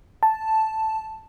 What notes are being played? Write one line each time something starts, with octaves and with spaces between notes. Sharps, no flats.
A5